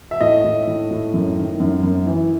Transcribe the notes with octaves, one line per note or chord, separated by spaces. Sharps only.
E5
A2 D#5
A2
A2
A2
F#2
D#3
F#2
F#2
E3